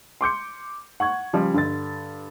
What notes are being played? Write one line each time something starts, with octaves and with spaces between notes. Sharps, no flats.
C6 D6 G6 C#7
F#5 C#6 G#6
C#3 F3 G3
G2 D3 A6